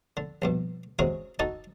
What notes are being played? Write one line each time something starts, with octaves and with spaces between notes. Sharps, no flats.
D3
A#1 G2 B2
C3 G#3 C#4 F#4 G#4 A#4
D#4 F#4 A4 D#5 A5